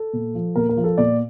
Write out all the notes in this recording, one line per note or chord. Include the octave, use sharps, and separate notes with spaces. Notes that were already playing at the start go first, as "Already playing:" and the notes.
Already playing: A4
A#2
F3
A#2 A#4
A#4
F3
A4
A#2 D5